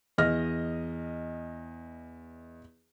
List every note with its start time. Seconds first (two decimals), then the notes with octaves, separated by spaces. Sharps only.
0.18 E2 D#5 F6 A#6